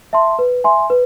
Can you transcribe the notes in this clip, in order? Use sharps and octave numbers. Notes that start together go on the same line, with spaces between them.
E5 A5 C6
B4
E5 G#5 C6
B4